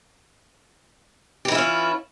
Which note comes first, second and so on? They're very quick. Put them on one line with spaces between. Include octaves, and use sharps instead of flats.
G4 E3 E4 F4 C#4